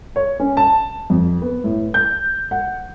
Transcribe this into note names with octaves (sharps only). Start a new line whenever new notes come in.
C#5
C#4
A5
F2
B3
A2
G6
F#5